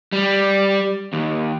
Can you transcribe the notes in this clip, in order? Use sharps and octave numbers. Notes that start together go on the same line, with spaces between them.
G3
D#2